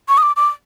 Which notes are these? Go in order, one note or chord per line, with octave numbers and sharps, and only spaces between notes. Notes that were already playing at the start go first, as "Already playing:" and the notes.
C#6
D#6
D6
D6